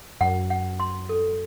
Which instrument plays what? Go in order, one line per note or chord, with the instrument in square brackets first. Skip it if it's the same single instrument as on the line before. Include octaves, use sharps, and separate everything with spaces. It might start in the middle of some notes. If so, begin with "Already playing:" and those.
[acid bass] F#2 [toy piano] F#5
[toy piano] F#5
C6
A4